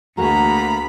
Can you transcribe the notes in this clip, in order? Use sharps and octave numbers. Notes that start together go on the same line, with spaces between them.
D2 A3 A#3 F#4 G#4 A#5 B5